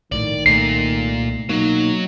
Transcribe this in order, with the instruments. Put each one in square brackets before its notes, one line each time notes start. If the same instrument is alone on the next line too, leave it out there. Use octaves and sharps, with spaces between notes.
[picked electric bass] A#1 A2 [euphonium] D#3 [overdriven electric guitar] D5
[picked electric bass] C2 A3 [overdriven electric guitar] A#2 [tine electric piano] C7
[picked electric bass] B2 A#3 [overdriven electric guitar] F#3 [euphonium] D#4